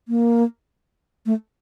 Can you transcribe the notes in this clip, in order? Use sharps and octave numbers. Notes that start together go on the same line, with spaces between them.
A#3
A3